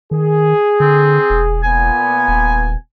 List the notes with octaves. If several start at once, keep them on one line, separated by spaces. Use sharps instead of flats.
D#3 G#4
D3 C4
E1
A#2 B3 G#5
D#1